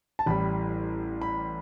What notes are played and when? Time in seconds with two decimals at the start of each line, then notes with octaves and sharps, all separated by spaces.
0.19 A5
0.26 A1 A2 G3 B5
1.22 B5